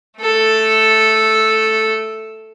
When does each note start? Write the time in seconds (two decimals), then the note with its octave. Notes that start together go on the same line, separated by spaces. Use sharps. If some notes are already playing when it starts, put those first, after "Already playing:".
0.20 A3 A4